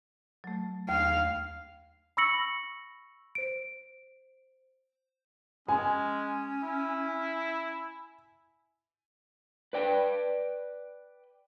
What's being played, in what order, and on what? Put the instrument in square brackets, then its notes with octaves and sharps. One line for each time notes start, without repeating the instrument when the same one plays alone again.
[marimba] F#3 A3
[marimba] D#2 [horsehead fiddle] F5
[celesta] B5 C#6 E6 A#6 C#7 F#7
C5 D7
[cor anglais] G#3 [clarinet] C#4 [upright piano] G#5
[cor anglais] E4
[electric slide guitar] B4 D5 G5